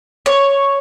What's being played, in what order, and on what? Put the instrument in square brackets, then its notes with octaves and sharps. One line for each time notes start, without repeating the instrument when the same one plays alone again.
[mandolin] C#5